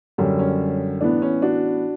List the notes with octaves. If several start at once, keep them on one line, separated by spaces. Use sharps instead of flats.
F#2 D3 G3 C#4
C#4
A2 E3 B3 D4
C#4
D4 F#4